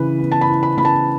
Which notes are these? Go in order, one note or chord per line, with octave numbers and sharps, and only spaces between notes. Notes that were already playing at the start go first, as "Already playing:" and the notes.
Already playing: C#3 E3 B4
B3
A5
B5
E4
B5
C#3 B5
A5